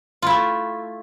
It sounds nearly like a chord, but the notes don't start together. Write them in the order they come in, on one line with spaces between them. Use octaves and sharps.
F4 E4 A3